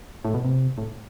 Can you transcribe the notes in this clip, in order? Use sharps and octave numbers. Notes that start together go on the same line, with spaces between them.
A2
B2
C3
A2